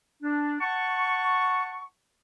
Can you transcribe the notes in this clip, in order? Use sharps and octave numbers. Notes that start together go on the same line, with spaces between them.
D4
F#5 A5 C#6